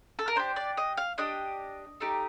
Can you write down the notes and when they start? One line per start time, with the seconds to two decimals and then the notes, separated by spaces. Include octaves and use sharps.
0.19 A4
0.28 A#4
0.36 D4 G4 C5
0.56 D5
0.77 D#5
0.97 F5
1.18 D4 G4 D#5
2.00 A3 D#4 G4